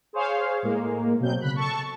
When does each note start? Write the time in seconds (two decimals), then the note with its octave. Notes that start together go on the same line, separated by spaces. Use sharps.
0.13 G#4 C5 C#5 F5
0.63 A2 G#3 A#3
1.20 B2 F#3 C4 G6
1.40 C#3 B5 F#6
1.56 A4 A5 C#6